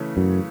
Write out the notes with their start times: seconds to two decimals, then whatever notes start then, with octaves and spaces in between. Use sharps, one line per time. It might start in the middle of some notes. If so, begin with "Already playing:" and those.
Already playing: C#3 E3 A3 C#4
0.17 F#2